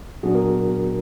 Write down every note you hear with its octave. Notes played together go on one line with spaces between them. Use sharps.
A#2 F#3 B3 D4 F#4 G#4
G#4 A#4